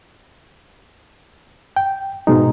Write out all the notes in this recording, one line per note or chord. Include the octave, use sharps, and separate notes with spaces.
G5
G#2 B2 G#3 D#4